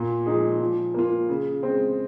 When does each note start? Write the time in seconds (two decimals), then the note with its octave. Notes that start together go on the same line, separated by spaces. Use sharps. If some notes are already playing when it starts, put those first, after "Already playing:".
Already playing: A#2
0.26 F3 G#3 D#4 G#4
0.60 F3
0.94 A#3 F4
1.29 C#3
1.63 G#3 C4